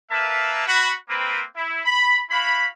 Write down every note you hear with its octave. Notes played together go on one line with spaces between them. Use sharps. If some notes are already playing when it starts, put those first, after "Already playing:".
A#3 A#4 B4 E5 F5 A5
F#4 B5
A#3 C4 B4
E4
B5
E4 F#4 F5 B5